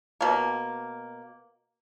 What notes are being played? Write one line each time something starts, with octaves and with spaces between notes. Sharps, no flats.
B2 A#3